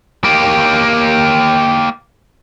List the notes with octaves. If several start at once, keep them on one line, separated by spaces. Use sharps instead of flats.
A#3 G4